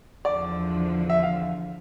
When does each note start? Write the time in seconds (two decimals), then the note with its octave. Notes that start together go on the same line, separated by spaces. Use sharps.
0.25 E2 D3 F3 D5
1.10 E5
1.23 F5